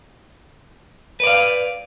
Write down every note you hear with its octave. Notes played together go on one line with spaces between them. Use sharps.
B4 D5 F5